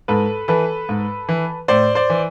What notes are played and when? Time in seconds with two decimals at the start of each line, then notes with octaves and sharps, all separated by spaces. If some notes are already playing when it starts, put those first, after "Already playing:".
0.08 G#2 A4 B4
0.48 E3 A4 B4
0.89 G#2
1.29 E3
1.68 A2 C5 D5
1.95 C5 D5
2.10 E3